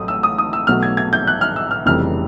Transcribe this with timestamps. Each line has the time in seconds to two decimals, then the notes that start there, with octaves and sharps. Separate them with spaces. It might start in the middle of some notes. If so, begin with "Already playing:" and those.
Already playing: A1 A2 F#3 A3 D#6
0.08 E6
0.23 D#6
0.38 D#6
0.53 E6
0.67 B1 B2 F#3 A3 F6
0.83 G#6
0.97 G#6
1.13 G6
1.27 F#6
1.41 F6
1.56 E6
1.71 F6
1.86 F1 F2 C#3 E3 G3 F6